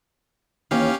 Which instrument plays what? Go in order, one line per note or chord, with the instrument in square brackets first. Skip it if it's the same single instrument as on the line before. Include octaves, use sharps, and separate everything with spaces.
[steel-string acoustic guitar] D#2 E3 [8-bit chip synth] C#4 G4 F5